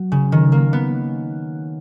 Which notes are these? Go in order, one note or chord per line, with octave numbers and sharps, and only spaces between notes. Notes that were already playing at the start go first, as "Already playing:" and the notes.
Already playing: F#3
C#3
D#3
A#3
B3